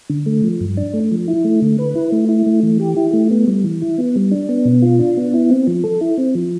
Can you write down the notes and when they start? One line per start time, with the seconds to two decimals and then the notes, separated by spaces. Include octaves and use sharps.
0.10 D3
0.26 A3
0.44 F3
0.61 G2
0.77 D4
0.94 A3
1.11 F3
1.28 E4
1.44 A3
1.62 D3
1.79 B4
1.95 E4
2.12 A3
2.29 E4
2.46 A3
2.63 E3
2.80 G4
2.96 E4
3.13 A3
3.31 B3
3.47 G3
3.64 E3
3.82 E4
3.98 B3
4.16 G3
4.31 D4
4.49 B3
4.65 B2
4.82 F4
4.99 D4
5.17 B3
5.34 E4
5.50 C4
5.67 F3
5.84 A4
6.01 E4
6.18 C4
6.35 F3